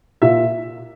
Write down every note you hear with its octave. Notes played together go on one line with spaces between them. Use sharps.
A#2 E5